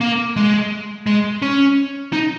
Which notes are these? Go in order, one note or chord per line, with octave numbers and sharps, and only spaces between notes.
A#3
G#3
G#3
C#4
D#4